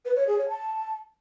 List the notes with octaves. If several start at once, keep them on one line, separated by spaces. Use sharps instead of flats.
B4
C#5
G#4
C#5
A5